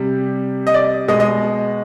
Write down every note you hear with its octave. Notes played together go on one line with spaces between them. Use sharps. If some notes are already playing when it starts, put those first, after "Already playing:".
Already playing: C3 G3
D#5
D5
B2 G#3 D#5
D#5